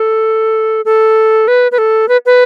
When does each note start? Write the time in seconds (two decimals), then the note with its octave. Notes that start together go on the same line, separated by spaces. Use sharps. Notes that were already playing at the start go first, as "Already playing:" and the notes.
Already playing: A4
0.85 A4
1.48 B4
1.72 B4
1.78 A4
2.09 B4
2.26 B4